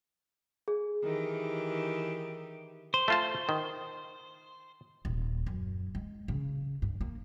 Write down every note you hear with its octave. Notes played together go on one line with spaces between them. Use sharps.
G#4
D#3 E3 G4
C5
A3 F4 A5
D#3
D#1
F#2
G#3
C#3
G2
A#3